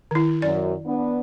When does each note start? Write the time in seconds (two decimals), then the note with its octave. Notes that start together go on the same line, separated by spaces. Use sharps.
0.11 D#3 E4
0.42 F#2 D5
0.85 B3 D4